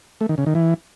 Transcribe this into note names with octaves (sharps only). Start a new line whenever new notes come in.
A3
D#3
C#3
D#3
E3